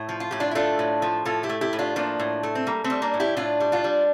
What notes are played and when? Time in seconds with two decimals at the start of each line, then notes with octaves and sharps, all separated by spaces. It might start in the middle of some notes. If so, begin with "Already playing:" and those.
Already playing: A2
0.09 F3
0.20 F4
0.31 A2 G4
0.40 D4 F4
0.51 E4
0.55 A3 D4 F4
0.79 A2
1.02 F3
1.25 A2 F4 A4
1.43 E4 G4
1.49 A3
1.61 E4 G4
1.73 A2
1.79 D4 F4
1.96 F3 A#3 D4
2.19 A2
2.43 A3
2.55 C4
2.67 G3 A#3
2.84 A3 C4
2.90 G3
3.02 A#3 D4
3.14 A2
3.20 E4 G4
3.37 A2 D4 F4
3.60 G3
3.72 D4 F4
3.84 G3